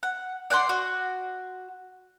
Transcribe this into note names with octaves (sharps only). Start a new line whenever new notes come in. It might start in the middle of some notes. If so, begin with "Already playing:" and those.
F#5
D5 F#5 G5 C6
F#4